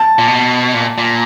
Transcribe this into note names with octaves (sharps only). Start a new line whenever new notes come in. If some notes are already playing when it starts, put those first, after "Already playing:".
Already playing: A5
A#2
B2
A#2
A#2